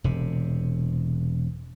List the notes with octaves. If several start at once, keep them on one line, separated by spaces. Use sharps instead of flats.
E1 C3